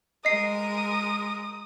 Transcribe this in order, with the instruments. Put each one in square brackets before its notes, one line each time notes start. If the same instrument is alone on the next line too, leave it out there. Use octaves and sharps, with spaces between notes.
[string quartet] G#3 A#4 [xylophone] D#5 C7 [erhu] D#6